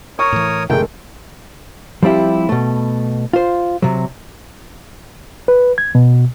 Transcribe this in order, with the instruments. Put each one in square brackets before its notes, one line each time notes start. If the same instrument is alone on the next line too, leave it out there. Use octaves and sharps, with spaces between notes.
[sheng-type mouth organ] A#4 C#5 D#6 [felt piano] C#6
[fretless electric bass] A2 E3
[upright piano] F1 A3 G#4 [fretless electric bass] G#2 D3 [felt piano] A#4 [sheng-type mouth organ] G5
[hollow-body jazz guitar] F3 G3 C4 E4 G4
B2 A3
F4 C5
C3 F#3
[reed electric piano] B4
G#6
B2